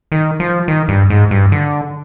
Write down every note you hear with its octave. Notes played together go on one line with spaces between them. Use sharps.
D#3
F3
D#3
G2
G#2
G2
D3